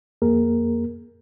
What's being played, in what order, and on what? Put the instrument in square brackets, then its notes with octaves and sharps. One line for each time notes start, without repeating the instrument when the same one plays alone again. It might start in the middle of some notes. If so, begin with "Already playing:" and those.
[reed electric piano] F2 A#3 G#4 A#4